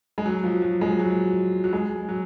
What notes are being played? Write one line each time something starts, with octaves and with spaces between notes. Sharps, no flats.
G#3
F#3
F3
F#3
G#3
F#3
F#3
G#3
F#3